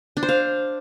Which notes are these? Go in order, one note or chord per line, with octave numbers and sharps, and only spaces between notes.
D4
C5
F5